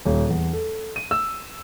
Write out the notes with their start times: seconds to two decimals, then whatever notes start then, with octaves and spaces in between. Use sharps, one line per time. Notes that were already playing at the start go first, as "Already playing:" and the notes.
0.05 D#1
0.29 E2
0.53 A4
0.96 D#7
1.11 E6